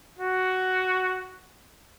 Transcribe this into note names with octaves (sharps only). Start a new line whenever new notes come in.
F#4